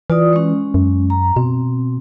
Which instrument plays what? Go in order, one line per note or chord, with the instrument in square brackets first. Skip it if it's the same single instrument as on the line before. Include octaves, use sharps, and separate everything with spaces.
[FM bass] E3 [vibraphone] F4 D5 D#6
[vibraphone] G#3 C#4
[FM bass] F#2
[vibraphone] A#5
[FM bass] B2 [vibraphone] C4